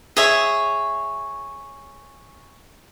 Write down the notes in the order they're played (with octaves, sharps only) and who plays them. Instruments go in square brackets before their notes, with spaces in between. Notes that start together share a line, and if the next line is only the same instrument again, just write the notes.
[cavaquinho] G#4 C#5 E5